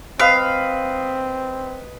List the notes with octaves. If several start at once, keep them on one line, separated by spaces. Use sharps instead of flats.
C4 B4 D#5 F5